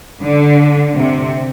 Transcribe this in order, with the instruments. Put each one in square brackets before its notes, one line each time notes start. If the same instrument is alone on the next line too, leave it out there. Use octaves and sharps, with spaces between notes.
[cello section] D3
C3